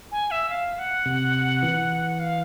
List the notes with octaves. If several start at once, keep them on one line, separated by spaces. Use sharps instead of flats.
G#5
E5
F5
F#5
C3
E3
F5